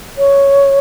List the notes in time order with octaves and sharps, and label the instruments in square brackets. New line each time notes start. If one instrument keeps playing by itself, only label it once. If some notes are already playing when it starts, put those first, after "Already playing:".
[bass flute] C#5